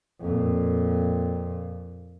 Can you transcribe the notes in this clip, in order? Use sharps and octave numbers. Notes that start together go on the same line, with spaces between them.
F2 A#2